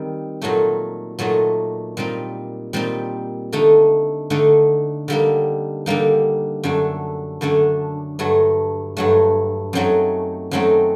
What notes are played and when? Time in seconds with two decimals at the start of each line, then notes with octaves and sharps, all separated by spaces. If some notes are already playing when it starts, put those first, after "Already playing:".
Already playing: D#3 G3 C4 D#4
0.42 A#2 F#3 A3 D#4
1.19 A#2 F#3 A3 D#4
1.97 A#2 G3 C4 D#4
2.73 A#2 G3 C4 D#4
3.53 D3 A3 D#4
4.30 D3 A3 D#4
5.08 D3 G3 A#3 D#4
5.86 D3 G3 A#3 D#4
6.64 F#2 D3 A3 D4
7.41 F#2 D3 A3 D4
8.19 G2 F#3 A3
8.97 G2 F#3 A3
9.73 F#2 F#3 A3 C4 D#4
10.51 F#2 F#3 A3 C4 D#4